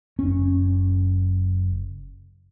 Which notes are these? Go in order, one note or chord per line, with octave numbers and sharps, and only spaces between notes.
F#1 C#4